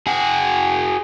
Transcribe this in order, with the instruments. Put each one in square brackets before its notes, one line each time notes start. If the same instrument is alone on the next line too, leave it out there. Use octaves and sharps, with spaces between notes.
[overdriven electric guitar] F#4 G#4